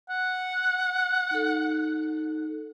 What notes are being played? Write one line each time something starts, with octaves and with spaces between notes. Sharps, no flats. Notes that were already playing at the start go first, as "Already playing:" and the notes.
F#5
D#4 A4